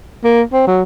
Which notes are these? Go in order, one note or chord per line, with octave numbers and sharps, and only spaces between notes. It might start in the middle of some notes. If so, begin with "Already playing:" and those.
A#3
C4
F#3